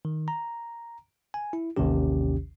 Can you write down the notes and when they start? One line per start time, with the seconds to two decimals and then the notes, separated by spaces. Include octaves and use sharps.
0.05 D#3
0.28 A#5
1.34 G#5
1.53 E4
1.76 A1 D#2 C3 D#3 C#4 G4